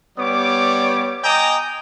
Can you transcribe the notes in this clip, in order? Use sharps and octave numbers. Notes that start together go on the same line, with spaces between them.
G3 B3 C#5 D5 D6
D#5 G5 G#5 A#5 D6 D#6